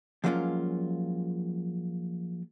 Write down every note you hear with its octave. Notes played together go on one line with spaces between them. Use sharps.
F3 F#3 G#3 A#3 C#4 F4